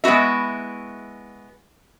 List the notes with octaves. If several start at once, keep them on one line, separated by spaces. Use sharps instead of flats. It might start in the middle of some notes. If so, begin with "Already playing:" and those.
G#3 B3 E4 F#4 E5